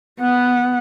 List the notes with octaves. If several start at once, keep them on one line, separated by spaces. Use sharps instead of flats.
B3 F#5